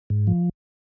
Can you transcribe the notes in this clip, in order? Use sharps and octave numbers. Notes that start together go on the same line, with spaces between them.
G#2
F3